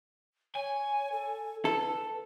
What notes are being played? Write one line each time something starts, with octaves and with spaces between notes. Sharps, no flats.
C#5 G#5
A4
A4 B4